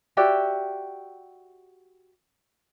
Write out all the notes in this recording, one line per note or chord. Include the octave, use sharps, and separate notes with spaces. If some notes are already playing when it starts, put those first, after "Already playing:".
F#4 G4 D5 E5